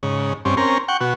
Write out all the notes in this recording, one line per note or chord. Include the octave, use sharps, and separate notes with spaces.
G#2 C#3
G2 C4 C#4
C4 C#4 A#4
F#5 G5 C#6
B2 F#4